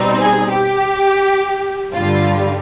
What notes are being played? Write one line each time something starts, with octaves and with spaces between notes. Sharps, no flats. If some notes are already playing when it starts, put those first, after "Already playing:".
Already playing: B2 G3 C4 D#4
G#4
G4
G2 D3 G3 F4